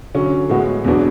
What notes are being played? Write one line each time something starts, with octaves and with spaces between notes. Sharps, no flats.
D3 F#3 C#4
A2 G#3 B3 F#4
E2 B2 F#3 B3 D4